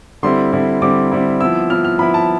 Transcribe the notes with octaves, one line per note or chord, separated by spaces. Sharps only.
D3 G3 C4 E4 C6
D3 G3 C4 E4
D3 G3 C4 E4 D6
D3 G3 C4 E4
F3 B3 E4 E6
F3 B3 E4 F6
F6
F3 B3 E4 B5
A5